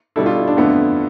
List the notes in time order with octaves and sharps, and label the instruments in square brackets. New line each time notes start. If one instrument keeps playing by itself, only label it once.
[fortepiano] B2 G3 D4 A4 [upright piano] E4
[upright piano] F4
E4
D4
[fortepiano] F2 D3 A3 E4 A4 [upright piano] B3